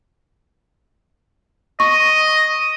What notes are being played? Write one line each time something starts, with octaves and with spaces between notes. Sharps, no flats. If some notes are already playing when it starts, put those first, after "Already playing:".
D#5 C#6